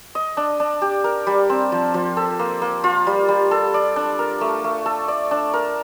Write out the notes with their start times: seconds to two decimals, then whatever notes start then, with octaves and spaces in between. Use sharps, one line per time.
0.15 D#5
0.37 D4
0.60 D4
0.82 G4
1.04 A#4
1.27 G3
1.50 C4
1.72 F3
1.94 F3
2.17 A4
2.39 A#3
2.62 A#3
2.84 F4
3.07 G3
3.29 G3
3.51 A4
3.74 D5
3.96 D4
4.19 A#4
4.41 A3
4.64 A3
4.86 A4
5.08 D5
5.31 D4
5.54 A#4